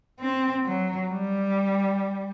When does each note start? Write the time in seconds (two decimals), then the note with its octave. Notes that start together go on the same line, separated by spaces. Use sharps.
0.20 C4
0.65 F#3
1.09 G3